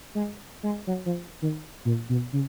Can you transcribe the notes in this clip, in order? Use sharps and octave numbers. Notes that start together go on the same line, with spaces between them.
G#3
G#3
F#3
F3
D#3
A#2
B2
C#3